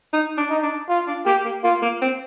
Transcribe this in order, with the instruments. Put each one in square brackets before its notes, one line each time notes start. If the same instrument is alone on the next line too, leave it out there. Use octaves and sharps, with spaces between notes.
[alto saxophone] D#4
D4
[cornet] D#4
[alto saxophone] D4
[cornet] F4
[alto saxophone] D4
[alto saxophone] A#3 [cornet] G4
[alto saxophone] A#3
[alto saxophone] A#3 [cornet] F4
[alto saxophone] A#3
C4